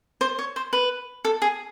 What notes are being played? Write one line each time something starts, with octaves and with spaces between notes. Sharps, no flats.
C5
C#5
C5
B4
A4
G#4